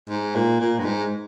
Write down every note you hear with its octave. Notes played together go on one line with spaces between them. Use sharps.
G#2
A#2
A#2
G2
G#2